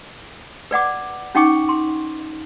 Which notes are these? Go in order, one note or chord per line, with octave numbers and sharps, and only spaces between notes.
B4 D5 F#5 D6
C#4 D#4 F#5 G5 C#6 D6
C6